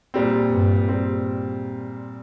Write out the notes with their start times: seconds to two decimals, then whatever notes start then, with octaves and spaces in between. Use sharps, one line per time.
0.14 A#2 G3 C4
0.50 G2
0.88 A#2 G3 C4